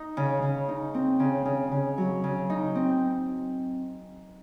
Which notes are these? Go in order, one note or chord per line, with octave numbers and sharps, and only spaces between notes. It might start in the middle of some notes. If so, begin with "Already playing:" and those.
Already playing: D#4
C#3
C#3
D#4
C4
C#3
C#3
C#3
F#3
C#3
D#4
C4